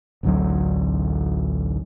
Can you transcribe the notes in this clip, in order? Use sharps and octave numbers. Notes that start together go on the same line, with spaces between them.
A1 D2 D3 F#3